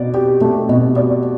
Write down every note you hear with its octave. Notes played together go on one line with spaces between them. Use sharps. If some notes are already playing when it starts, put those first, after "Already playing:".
Already playing: B2 D5
G4
A3
B2
D5